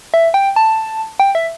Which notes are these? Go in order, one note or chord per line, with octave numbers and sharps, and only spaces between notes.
E5
G5
A5
G5
E5